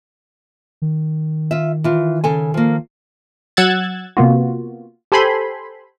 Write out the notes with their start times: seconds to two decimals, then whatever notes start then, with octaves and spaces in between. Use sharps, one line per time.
0.82 D#3
1.51 F4 E5
1.84 E3 F4
2.24 C#3 A4 G#5
2.54 F3 A#3
3.57 F#3 F#5 E6 F#6 G#6 A6
4.17 C3 A#3 B3 F4 F#4
5.12 G4 A4 C5 G#5 B5 C6